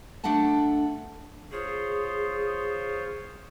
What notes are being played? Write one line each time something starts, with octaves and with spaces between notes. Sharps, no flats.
A3 D4 A4 F#5 A5
F4 G#4 C5 C#5